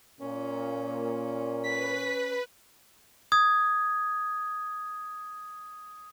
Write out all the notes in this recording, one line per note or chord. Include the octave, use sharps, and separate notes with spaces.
A#2 C#4
B4 B6
D#6 G#6